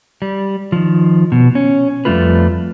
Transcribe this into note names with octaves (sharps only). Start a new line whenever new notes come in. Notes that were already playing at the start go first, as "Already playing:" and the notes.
G3
D#3 F3
B2
C#4
F2 G3 A3 F4 B4